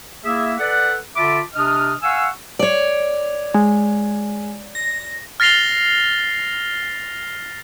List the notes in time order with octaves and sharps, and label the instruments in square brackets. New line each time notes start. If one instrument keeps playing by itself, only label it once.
[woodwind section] A#3 E4 G#4 E5
A4 B4 D5 F#5
D3 F4 E5 A5 B5 D6
C3 D4 D#5 D#6 F6
F5 F#5 G#5 C#6 E6
[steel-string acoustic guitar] C#5 D5
[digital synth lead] G#3
A#6
[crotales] F6 A6 A#6 C7 F7 G7